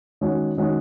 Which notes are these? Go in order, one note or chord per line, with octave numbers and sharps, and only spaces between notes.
D#3 G#3 C#4 F#4
D#3 G#3 C#4 F#4